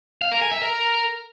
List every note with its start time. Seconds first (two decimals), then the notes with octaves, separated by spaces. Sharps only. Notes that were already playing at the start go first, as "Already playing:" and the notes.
0.22 F5
0.32 A#4
0.42 G#5
0.52 E5
0.62 A#4